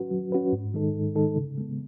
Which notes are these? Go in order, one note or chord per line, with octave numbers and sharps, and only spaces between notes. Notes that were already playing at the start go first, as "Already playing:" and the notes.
Already playing: F#3 C#4 F#4 B4
F#3
C#4 F#4 B4
G#2
D#3 G#3 D#4 A4
G#2
D#3 G#3 D#4 A4
C#3
G#3 B3